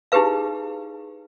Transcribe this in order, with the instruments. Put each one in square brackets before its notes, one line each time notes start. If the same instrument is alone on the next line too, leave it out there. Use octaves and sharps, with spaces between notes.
[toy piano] D#4 E4 G4 G#4 B4 F5